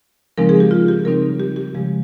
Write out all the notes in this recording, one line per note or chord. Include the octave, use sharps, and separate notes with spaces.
C#3 F3 G#3 C4 D#4 A#4
G#4
G4
F4
G4
C#3 G3 C4 D#4 A#4
G4
G4
C#3 F3 G#3 G4